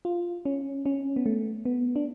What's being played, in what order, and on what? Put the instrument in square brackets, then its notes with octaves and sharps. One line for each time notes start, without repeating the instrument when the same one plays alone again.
[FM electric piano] F4
C#4
C#4
B3
A3
B3
D4